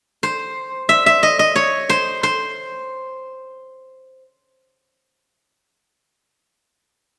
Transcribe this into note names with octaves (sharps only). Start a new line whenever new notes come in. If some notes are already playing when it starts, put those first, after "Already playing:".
C5
E5
E5
D#5
D#5
C#5
C5
C5